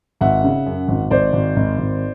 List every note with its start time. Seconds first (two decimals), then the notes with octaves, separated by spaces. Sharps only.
0.21 G#1 E5 F#5
0.44 C#3
0.66 F#2
0.88 G#1
1.11 G#1 C5 D5
1.33 G#1
1.56 G#1
1.78 G#1